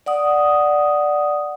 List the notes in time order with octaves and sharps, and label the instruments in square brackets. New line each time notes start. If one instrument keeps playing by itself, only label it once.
[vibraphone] D5 F#5 D#6